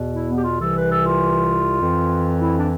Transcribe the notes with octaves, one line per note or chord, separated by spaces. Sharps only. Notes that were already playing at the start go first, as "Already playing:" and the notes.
Already playing: E2 B2
E4
B3
G4
F4
C2 C3 E3 A4
B4
A4
F4
F2 E3
E4
D4